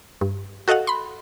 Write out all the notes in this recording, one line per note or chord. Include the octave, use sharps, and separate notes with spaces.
G2
F#4 A4 D#5 F5 F#5
B5 C6